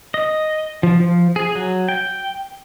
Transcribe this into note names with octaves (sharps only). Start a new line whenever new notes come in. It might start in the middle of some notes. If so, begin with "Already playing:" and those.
D#5
F3
F3
G#4
F#3
G5